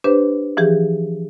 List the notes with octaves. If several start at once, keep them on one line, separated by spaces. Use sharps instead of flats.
D4 G4 B4 C5
E3 F3 G4 G#4